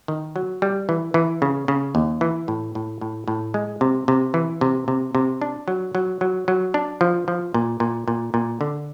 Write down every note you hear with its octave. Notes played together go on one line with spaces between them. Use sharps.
D#3
F#3
G3
E3
E3
C#3
C#3
D#2
E3
A2
A2
A2
A2
G#3
C3
C3
E3
C3
C3
C3
D4
F#3
F#3
F#3
F#3
D4
F3
F3
A#2
A#2
A#2
A#2
D3